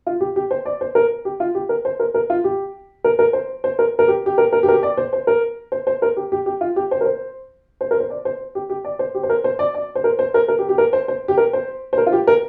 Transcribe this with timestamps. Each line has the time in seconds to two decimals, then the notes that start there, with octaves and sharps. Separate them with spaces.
0.07 F4
0.21 G4
0.36 G4
0.51 C5
0.66 D5
0.81 C5
0.95 A#4
1.25 G4
1.40 F4
1.55 G4
1.69 A#4
1.85 C5
2.00 A#4
2.14 A#4
2.30 F4
2.44 G4
3.04 A#4
3.19 A#4
3.33 C5
3.64 C5
3.79 A#4
3.99 A#4
4.08 G4
4.26 G4
4.38 A#4
4.53 A#4
4.63 G4
4.68 A#4
4.73 G4
4.83 D5
4.97 C5
5.13 C5
5.27 A#4
5.72 C5
5.87 C5
6.02 A#4
6.17 G4
6.32 G4
6.46 G4
6.61 F4
6.76 G4
6.91 C5
7.01 A#4
7.06 C5
7.81 C5
7.91 A#4
8.00 C5
8.10 D5
8.25 C5
8.55 G4
8.70 G4
8.85 D5
8.99 C5
9.15 G4
9.23 C5
9.30 A#4
9.44 C5
9.59 D5
9.75 D5
9.95 C5
10.04 A#4
10.19 C5
10.34 A#4
10.48 A#4
10.59 G4
10.69 G4
10.78 A#4
10.93 C5
11.08 C5
11.28 G4
11.38 A#4
11.53 C5
11.93 C5
11.98 A#4
12.07 F4
12.13 G4
12.27 A#4